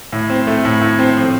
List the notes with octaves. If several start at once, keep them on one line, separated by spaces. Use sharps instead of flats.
A2
C4
A3
A2
A2
C4
F3